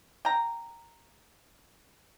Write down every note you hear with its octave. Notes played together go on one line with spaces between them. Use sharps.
G5 A#5